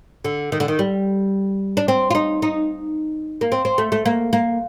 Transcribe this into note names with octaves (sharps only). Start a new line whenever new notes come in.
D3
D#3
D3
D#3
G3
D4
C4
F4
D#4
D#4
A#3
C4
C4
A3
A3
A#3
A#3